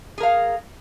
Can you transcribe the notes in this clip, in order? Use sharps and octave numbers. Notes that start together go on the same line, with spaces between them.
G#4 A#4 F5